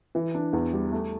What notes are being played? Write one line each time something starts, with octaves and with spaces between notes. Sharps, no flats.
E3
D4
E2
G3
A3